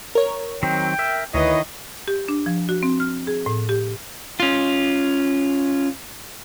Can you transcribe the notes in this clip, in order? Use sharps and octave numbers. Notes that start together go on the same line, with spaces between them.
A#4 C#5
D#3 F#3 C4 G5
A#4 E5 E6
D2 D#3 E4 B4 C#5 D#5
G4
D4
F3
F#4
C4
F6
G#4
A2
G4
C#4 F4